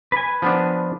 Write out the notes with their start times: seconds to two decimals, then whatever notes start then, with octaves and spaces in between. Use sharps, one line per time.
0.12 B4 G#5
0.42 F3 B3 D4